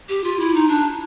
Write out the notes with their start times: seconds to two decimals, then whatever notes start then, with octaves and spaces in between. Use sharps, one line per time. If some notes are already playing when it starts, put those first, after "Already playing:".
0.09 G4
0.24 F4
0.39 E4
0.54 D#4
0.69 D4